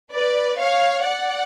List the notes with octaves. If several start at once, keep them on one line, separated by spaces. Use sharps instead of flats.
B4 D5
C#5 F5
D5 F#5